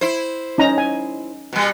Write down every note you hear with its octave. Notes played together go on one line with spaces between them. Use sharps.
E4 C5
C#4 D#4 A#5
G#5
B2 G3